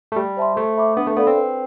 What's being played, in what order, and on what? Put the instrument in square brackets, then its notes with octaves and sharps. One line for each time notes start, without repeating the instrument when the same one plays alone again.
[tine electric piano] A3
[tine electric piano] G3 [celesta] G4
[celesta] C5 E5 A5 C6
[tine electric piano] A3 [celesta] C5
[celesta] E5 B5 D6
[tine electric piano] B3 [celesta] D4
[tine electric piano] A3
[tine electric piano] B3 [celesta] A4 D5 F5 B5
[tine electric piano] C4
[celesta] B4